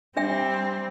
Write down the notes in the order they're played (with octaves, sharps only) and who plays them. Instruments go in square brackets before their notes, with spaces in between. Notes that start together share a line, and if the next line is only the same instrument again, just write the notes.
[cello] G3 C4 [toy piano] D4 E5 G5